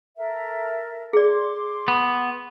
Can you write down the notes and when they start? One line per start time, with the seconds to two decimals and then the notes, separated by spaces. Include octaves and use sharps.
0.17 A4 A#4 E5
1.13 G#4 D5 C6 D6
1.88 B3